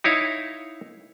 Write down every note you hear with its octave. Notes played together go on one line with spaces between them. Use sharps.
D#4 E4 C#5 F5